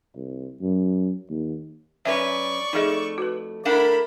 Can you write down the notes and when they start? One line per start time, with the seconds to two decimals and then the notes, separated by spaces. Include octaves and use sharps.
0.16 C2
0.61 F#2
1.30 D#2
2.05 F#2 C#4 B4 D5 E5 C#6
2.73 F2 A3 D#4 G#4 D#5
3.18 F#4 B4
3.65 A3 D4 E4 A#4 F#5 B5